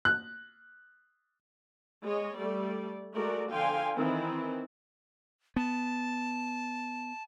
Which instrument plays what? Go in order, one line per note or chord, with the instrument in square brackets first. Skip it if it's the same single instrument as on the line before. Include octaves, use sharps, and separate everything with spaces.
[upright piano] F#6
[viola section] G#3 C#5 D#5
G3 A3 A4 D5
G#3 A3 F#4 A#4 D5
D3 F3 F5 G5 G#5 C6
D#3 E3 C4 E4
[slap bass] B3 [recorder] A5